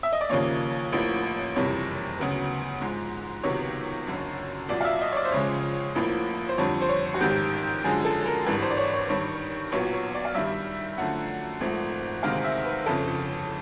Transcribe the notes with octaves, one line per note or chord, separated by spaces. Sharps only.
E5
D#5
D5
D#2 C#3 F3 A#3 C#5
A1 A2 F3 A#3
F#1 F2 C3 E3 G3 C#5
D2 C#3 F#3 B3
G#2 F3 G#3
C#2 C3 D#3 F#3 B3 C#5
F#1 F#2 D3
C2 A#2 F#3 D5
F5
E5
D#5
C#5
D5
C5
C#2 C#3 F3 G#3 C#5
A1 A2 F3 A#3
C5
F2 D3 G3 C#5
C5
C#5
F#4
A1 G#2 D#3 G4
F#2 D3 F3 G#3 G#4
A4
A#4
G#1 G2 E3 G3 B4
C5
D5
C#5
C#5
G2 D#3 G3 C#5
B1 A#2 F#3 B3 C#5
C#5
D5
F5
G2 D#3 G3 E5
F#2 D3 F3 A3 F#5
G#1 G#2 F3 A3 C4
D2 C3 D#3 G#3 C4 F5
E5
B4
G1 F2 C#3 A4